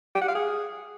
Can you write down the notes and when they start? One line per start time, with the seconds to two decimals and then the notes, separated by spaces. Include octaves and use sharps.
0.15 G4
0.22 F#5
0.28 F5
0.35 G#4